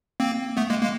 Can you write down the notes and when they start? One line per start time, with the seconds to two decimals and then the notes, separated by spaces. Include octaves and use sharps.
0.20 A#3 C4
0.57 A3 B3
0.70 G#3 A#3
0.82 G#3 A#3